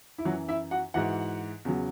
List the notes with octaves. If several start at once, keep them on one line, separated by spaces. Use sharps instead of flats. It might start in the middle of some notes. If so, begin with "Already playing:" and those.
E4
F#2 E3 F#3 F#4
E4 E5
F#4 F#5
G#2 E3 F#4 F#5
E2 C#3 F#3